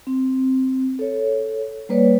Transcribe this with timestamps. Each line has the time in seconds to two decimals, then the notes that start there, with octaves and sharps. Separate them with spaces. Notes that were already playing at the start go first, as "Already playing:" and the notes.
0.07 C4
0.99 A4 C#5
1.89 G3 A#3 B4 C#5 D5